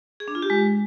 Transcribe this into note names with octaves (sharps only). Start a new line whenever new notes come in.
G#4
D4
F4
G4
G#3